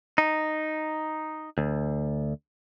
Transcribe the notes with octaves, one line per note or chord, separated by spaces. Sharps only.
D#4
D2